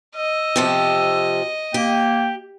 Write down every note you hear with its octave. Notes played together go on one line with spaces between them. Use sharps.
D#5 E6
C3 F3 G4
A#3 G4 G5